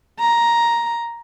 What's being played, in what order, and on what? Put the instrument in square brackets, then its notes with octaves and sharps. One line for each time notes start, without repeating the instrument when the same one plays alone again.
[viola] A#5